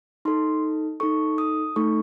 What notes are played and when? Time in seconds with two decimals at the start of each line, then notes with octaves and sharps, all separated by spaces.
0.25 D#4 A4 C6
1.00 D#4 A4 C#6
1.38 D#6
1.76 A3 D#4 A4 C#6